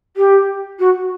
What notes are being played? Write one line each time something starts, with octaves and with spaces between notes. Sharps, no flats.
G4
F#4